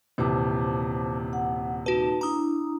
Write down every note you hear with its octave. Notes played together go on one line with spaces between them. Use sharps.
D#1 C3 E3 C5 A5 D6
F#5
D#4 F#4 B4 A5
D4 E4 A#5 D#6